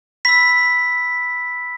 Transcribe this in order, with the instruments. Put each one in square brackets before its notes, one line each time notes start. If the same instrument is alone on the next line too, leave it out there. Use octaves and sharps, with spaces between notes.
[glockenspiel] B5 E6 B6